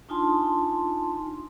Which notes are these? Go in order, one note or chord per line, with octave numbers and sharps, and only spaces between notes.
D4 D#4 F4 G#5 A5 C6